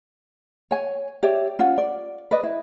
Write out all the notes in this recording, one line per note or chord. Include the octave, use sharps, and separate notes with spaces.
C#5 G#5
G4 C#5 D5 E5
C#4 F4 F#5
D5
B4 D5 D#5
E4